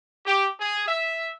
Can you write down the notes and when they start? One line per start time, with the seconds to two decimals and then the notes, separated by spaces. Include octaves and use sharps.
0.25 G4
0.59 G#4
0.87 E5